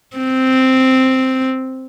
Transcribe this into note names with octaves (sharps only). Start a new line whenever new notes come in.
C4